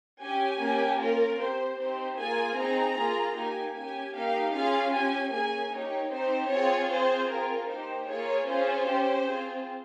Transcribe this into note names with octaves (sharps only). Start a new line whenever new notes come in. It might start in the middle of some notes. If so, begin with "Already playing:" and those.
C#4 G4 G#5
A#3 C#4 G4
A#3 C#4 F4 A#4
C4 G4 C5
C4 D#4 G4 C5
A#3 F4 G#4 G#5
C4 D#4 G#4 A#5
A#3 F4 G#4
A#3 D#4 G4 G#5
C#4 G4 G#5
A#3 D#4 G4 F5
C#4 F4 G#4 F5
C#4 G4 G#5
A#3 C#4 G#4 G#5
A#3 D#4 G4 C#5
C4 D#4 G4 C5
C4 F4 G#4 C#5
C4 F4 G#4 C5
C4 F4 G#4 A#4
A#3 D#4 G4 C5
A#3 F4 G#4 C#5
C#4 F4 G#4 C5
C#4 G4
C4 F4 G#4